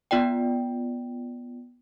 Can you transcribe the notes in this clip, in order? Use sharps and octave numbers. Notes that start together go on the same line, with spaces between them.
B3 F4 D5 G5